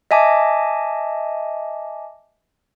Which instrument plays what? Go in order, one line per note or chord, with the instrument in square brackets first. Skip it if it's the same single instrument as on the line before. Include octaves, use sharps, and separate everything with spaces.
[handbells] D#5 E5 G#5 A5 D6